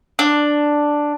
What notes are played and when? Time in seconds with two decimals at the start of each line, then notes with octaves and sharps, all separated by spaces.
0.19 D4